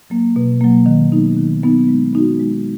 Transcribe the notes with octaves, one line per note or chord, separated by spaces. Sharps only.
F#3 A#3
B2
F#3 A#3
D#3
F#3 B3 D#4
D#3
F#3 B3 D#4
G#3
B3 D#4 F#4
G#3